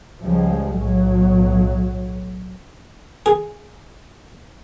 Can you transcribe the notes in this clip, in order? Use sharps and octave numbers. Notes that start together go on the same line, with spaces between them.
C#2 F3 G3 G#3
B1 A2 F#3
G#4